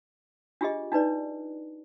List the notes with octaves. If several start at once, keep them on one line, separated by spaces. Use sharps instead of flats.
D4 F4 G4 G#4 D#5
D4 D#4 B4 D5